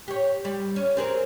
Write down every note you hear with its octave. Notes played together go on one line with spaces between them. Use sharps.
G4 C#5
G3
C#4
C4 G#4 A#4